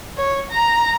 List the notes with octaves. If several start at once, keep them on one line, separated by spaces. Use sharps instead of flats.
C#5
A#5